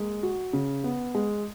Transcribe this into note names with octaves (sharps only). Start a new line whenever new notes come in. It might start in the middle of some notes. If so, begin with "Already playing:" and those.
Already playing: G#3 A#3
F#4
C#3
B3
G#3